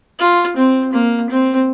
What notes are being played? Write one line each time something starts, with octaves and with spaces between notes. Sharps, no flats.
F4
C4
A#3
C4